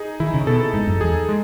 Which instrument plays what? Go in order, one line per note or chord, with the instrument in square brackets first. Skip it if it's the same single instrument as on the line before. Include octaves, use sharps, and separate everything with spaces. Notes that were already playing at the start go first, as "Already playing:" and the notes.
Already playing: [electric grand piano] D#4 G#4
[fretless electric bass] D#3 [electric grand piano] E4
[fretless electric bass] C#3
[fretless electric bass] B2 [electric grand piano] A4
[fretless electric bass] G#2 [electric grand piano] D#4
[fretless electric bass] F#2
[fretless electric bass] E2 [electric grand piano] G#4
[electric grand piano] G#3